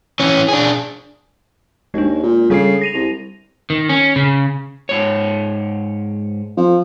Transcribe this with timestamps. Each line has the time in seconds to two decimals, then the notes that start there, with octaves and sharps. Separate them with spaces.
0.20 E3 C#4
0.49 D4 G#4
1.94 D#2 G#3 D4
2.23 A#2
2.50 C#3 G3 A4 C7
2.81 A#6 D#7 F7
2.94 C2
3.70 D#3
3.89 C#4
4.16 C#3
4.89 G#2 C#5
6.57 F3